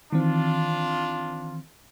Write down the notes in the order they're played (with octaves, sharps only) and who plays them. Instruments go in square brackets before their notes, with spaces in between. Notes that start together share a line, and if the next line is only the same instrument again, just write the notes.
[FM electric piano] D#3 E3 C4 [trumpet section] D4 F4